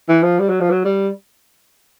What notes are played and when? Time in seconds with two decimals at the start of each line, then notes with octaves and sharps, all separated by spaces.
0.08 E3
0.23 F3
0.39 G3
0.49 F#3
0.61 F3
0.71 F#3
0.84 G3